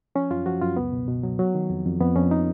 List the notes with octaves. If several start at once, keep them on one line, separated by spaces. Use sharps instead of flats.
F3 C#4
F#2 F4
F3 F#4
F#2 F4
C#2 B3
B2
B2
F#3
F#3
D#3
F2
F2
F2 B3
F2 C#4
D#4